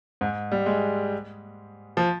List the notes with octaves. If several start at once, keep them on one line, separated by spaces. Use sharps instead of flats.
G#2
G3
G#3
F3